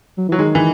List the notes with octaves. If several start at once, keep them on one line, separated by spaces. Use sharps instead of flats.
F#3
E3 F#3
D#3 G#3
E3